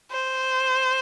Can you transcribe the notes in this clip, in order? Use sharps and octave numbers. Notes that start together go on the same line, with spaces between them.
C5